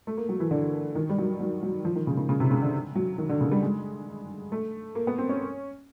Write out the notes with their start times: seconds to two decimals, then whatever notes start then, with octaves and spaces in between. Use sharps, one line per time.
0.07 A3
0.17 A#3
0.29 F#3
0.40 E3
0.51 D3
0.95 D#3
1.10 G3
1.18 F#3
1.40 F#3
1.63 F#3
1.85 F3
1.96 D#3
2.07 C#3
2.17 C#3
2.29 C#3
2.40 C3
2.51 C#3
2.62 D3
2.96 F#3
3.18 D#3
3.29 D3
3.41 C#3
3.51 G3
3.62 G#3
4.52 A3
4.95 A#3
5.07 B3
5.18 C4
5.29 C#4